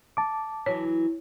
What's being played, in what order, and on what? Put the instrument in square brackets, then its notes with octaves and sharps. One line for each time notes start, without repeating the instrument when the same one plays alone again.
[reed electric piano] A5 D6
[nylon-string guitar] E3 F#3 [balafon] C#5